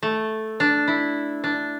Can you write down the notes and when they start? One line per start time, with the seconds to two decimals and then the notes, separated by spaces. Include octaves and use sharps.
0.03 A3
0.60 D4
0.88 E4
1.44 D4